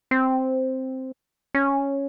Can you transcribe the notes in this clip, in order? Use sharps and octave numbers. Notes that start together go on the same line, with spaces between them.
C4
C#4